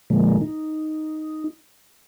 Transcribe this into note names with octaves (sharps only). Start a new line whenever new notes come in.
A#2 D3 F3 G#3 A#3
D#4